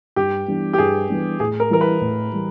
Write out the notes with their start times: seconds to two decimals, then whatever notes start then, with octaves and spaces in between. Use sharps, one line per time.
0.16 G2 G4
0.48 E3 G3 B3 D4
0.73 G4
0.78 G2 G#4
1.09 E3 G3 B3 D4
1.40 A2 G#4
1.60 A#4
1.70 E3 G3 A#4
1.81 B4
2.01 A2
2.33 E3 G3